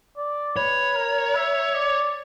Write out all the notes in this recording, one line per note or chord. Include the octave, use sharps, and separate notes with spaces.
D5
B4 C#5
A#4
E5
D5